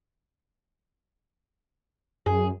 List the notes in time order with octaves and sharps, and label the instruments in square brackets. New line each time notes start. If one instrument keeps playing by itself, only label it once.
[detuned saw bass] F#2 [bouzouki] G#4